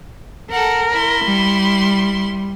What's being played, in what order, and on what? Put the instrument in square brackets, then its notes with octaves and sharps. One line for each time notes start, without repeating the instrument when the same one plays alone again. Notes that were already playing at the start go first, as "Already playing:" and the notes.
[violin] A4 F#5 [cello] A#4
[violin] E4 C6
[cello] G3